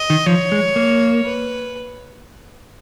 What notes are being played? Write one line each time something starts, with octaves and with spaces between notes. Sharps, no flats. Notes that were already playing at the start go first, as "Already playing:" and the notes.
Already playing: D#5
D#3
F3 C#5
G#3
A#3
B4